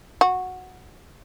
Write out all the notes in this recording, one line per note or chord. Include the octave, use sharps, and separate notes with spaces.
F#4